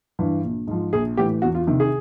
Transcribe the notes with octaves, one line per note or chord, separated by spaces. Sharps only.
G2 E3
A#1
G#2 F3
A#1 G#4
A2 E3 G4
E2 F#4
F4
C3 D#3
G#4